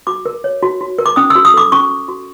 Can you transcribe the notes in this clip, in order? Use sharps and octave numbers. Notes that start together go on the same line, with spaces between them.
F#4 D6
A#4
C#5
F#4
F#4
A#4
D6
C#4 D#6
E6
F#4
D#6
A4 D6
C#4 C#6
C#4
F#4